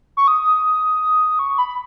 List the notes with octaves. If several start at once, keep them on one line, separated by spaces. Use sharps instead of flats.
C#6
D#6
C#6
B5